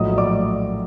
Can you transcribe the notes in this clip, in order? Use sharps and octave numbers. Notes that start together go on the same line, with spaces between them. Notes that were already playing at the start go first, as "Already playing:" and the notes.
Already playing: A#1 A2 F#3 D#5 D#6
D5 D6